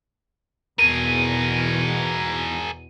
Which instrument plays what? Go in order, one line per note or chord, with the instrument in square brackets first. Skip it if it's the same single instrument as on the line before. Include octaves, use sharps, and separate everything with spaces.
[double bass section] E2 B2 [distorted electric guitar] G#4 A#4 [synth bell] D#7